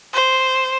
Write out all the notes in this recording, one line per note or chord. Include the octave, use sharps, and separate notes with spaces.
C5